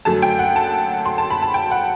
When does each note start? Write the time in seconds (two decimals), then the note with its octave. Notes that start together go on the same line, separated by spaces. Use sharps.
0.05 F#2 D3 F#3 A3 A5
0.22 G5
0.39 F#5
0.56 A5
1.05 C6
1.18 A5
1.30 B5
1.42 A5
1.54 G5
1.71 F#5